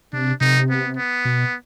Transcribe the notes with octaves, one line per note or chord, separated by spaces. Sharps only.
C3 D4
C3 D#4
B3
B3
B2